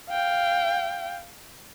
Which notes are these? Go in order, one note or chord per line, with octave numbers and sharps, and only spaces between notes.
F5 G5